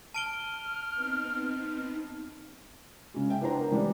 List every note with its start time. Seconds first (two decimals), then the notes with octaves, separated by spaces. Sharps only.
0.14 A5 F6 D7 G7
0.94 B3 C4 D#4
3.14 C#3 G#3
3.30 E5 G5
3.41 B3 D4 E4 C5 A#5
3.58 A#4
3.71 E3 G3 G#3 D5